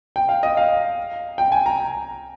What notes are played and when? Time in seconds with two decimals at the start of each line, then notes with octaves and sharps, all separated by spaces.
0.16 G5
0.29 F5
0.43 D#5
0.57 F5
1.38 G5
1.52 G#5
1.66 A#5